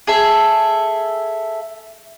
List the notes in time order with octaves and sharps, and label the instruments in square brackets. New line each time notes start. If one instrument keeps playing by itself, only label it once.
[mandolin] G#4 A4 E5